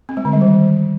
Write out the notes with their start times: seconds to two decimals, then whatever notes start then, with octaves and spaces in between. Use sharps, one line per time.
0.09 C4
0.17 G#3
0.25 D3
0.33 G3
0.41 D#3